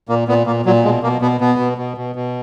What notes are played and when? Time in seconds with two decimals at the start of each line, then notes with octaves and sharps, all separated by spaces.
0.09 A#2 A#3
0.28 A#2 B3
0.46 A#2 A#3
0.65 A#2 F#3
0.84 B2 G#3
1.03 B2 A#3
1.22 B2 B3
1.40 B2 B3
1.59 B2
1.78 B2
1.97 B2
2.15 B2